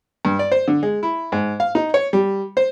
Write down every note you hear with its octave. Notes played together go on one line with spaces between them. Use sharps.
G2
D5
C5
D3
G#3
E4
G#2
F5
D#4
C#5
G3
C5